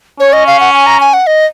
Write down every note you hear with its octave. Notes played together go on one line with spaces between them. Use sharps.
C#4 C#5
D#5
F5
F#5
G#5
A#5
G#5
F#5
D#5